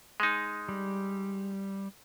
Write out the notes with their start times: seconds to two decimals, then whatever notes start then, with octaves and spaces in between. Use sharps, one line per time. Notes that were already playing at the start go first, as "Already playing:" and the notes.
0.20 G#3 D#4
0.69 G3